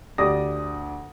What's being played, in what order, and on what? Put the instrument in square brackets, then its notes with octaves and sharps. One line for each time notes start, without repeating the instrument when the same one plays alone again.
[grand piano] D2 G4 D5 D#6 A#6